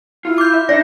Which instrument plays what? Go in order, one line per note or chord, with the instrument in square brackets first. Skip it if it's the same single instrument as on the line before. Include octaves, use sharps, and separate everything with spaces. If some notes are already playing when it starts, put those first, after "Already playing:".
[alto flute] E4 [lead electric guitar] F4
[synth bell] D6 G6
[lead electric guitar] E5
[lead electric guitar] D4 [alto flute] D#4 [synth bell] D5 [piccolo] A#6